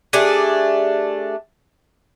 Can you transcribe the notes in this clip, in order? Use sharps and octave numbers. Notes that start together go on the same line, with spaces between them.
A3 D4 G4 G#4